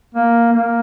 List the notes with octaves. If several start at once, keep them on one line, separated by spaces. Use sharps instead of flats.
A#3
A#3